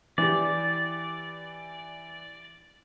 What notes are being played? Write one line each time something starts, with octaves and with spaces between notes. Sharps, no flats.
E3 G4 D5